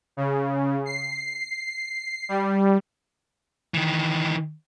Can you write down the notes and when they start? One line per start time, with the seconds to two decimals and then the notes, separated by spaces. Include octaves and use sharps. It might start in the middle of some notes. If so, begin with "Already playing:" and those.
0.17 C#3
0.86 C7
2.29 G3
3.74 D#3 E3